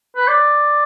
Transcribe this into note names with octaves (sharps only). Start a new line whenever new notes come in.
B4
D5